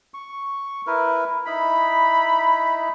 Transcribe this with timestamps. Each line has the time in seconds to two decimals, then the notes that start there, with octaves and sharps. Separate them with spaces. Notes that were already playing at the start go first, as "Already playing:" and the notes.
0.14 C#6
0.87 E4 A#4 B4
1.47 D#4 E4 B5